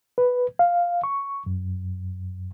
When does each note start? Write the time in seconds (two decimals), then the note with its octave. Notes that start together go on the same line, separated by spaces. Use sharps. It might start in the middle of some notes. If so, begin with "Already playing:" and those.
0.18 B4
0.59 F5
1.04 C#6
1.46 F#2